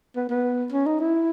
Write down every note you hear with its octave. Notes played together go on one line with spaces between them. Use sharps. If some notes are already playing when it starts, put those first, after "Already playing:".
B3
B3
C#4
D#4
E4